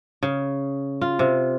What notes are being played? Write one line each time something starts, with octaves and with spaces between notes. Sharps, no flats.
C#3
F4
C3